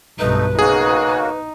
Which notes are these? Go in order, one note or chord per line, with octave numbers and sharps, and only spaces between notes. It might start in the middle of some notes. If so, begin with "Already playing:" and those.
B1 G2 A3 D#4 B4
C#3 A#3 D#4 F#4 G#4